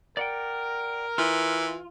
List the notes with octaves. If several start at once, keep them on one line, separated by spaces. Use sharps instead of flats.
A#4 D5 F#5 G5
E3 F4